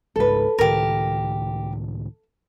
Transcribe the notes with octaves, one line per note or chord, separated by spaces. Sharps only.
G#1 C#2 G#2 A4 B4
C#2 A2 D#3 G4 A#4